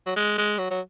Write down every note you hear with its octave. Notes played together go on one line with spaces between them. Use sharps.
F#3
G#3
G#3
F#3
F#3